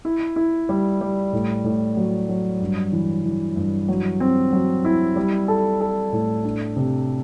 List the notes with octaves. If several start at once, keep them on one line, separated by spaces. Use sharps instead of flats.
E4
E4
G3
G3
A2
A2
F#3
F#3
G2
E3
E3
G2
F#3
C4
F#3
E4
G3
A4
A4
A2
D4
C3